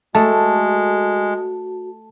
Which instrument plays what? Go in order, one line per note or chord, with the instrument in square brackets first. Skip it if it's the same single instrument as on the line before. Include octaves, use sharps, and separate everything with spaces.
[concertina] G#3 [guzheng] A3 [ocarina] F#4 [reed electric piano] A5